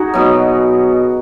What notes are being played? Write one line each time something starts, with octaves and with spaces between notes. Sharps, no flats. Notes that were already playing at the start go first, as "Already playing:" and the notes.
Already playing: D#4 F#4 G#4
B2 F#3